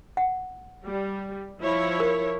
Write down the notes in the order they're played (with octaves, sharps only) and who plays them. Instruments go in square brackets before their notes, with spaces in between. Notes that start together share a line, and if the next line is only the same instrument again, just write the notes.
[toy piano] F#5
[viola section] G3
F3 E4 C#5
[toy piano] A#4